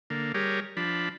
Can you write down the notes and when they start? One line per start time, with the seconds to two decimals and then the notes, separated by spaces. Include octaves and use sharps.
0.10 D3 A#3
0.34 G3 G4 G#4 A#4 C#5
0.77 F3 D4 B5